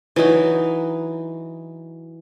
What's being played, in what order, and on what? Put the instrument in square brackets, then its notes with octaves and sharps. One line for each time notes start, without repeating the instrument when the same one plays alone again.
[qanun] E3 F#3 D#4 F#4